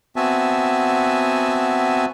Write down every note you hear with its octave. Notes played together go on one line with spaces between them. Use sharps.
B3 C4 F#4 E5 G#5 A5